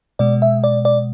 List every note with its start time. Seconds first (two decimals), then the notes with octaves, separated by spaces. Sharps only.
0.19 B2 G#3 D5
0.42 E5
0.64 D5
0.85 D5